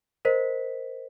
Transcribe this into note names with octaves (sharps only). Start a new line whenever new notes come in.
A#4 C5 D#5 B6